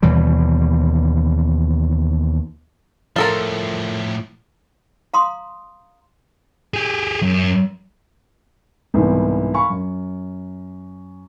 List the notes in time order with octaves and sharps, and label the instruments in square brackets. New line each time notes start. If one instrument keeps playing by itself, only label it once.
[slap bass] D#2 B2 E3 G3
[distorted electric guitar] A2 F3 [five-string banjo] F4 A4 A#4
[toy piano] F5 A#5 C6 D#6
[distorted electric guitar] G4 G#4
F#2
[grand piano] C2 G#2 B2 E3 B3
F5 G#5 B5 C#6
F#2